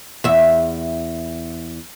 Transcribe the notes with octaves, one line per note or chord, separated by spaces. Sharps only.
E2 E5